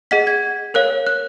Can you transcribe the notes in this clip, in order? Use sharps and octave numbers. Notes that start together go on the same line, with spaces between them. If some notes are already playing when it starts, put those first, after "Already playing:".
G#4 D#5 F#5 B6
G#6
A#4 C#5 F5 F#6
F#6